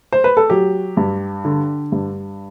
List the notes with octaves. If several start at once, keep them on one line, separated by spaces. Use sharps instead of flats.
C5
B4
A4
F#3 G4
G2
D3
G2